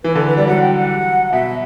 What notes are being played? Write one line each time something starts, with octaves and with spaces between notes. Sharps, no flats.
E3 B4
D3 A4
B4
G3 D5
F#3 F#5
G5
F#5
B2 E5